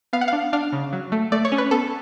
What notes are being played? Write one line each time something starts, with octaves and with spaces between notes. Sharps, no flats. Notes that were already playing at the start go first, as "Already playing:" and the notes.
B3 F5
F#5
F5
D4
D4 F5
C#3
F#3
A3
A3 D5
C#5
C#4
B4
B3 A4